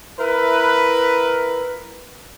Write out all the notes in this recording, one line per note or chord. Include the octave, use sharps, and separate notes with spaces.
E4 A#4 B4